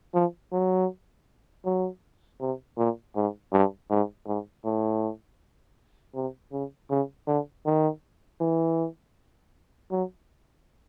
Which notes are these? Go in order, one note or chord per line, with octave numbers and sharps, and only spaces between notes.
F3
F#3
F#3
C3
A#2
G#2
G2
G#2
G#2
A2
C3
C#3
C#3
D3
D#3
E3
F#3